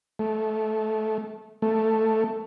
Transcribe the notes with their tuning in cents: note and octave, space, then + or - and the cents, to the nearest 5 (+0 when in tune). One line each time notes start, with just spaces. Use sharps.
A3 -20
A3 +5